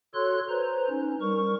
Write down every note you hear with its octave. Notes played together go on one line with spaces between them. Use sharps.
F#4 A4 C#5 C6 F#6
B4 C5 A#5
C#4 D#4
G3 A#4 C#6